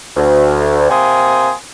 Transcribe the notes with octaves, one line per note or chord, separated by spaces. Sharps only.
D2
C3 A#3 G5 G#5 C6 D#6